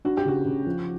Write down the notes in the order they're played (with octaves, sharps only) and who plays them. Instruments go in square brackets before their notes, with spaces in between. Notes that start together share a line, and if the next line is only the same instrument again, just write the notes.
[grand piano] D4 [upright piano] F#4
[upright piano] G4
[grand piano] C#3 [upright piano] F#4
[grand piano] C#3
F3